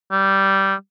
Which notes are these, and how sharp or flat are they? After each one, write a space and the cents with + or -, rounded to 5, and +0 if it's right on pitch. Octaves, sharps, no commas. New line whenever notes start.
G3 -10